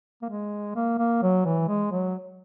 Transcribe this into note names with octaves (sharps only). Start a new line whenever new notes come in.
A#3
G#3
A#3
A#3
F#3
E3
G#3
F#3